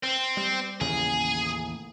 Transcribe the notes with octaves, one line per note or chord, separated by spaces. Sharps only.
C4
G3
A1 D#2 C#3 G#4